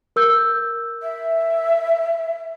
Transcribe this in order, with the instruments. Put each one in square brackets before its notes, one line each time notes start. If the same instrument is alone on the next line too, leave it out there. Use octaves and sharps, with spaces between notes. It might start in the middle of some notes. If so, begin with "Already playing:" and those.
[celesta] A#4 E6 G6
[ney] E5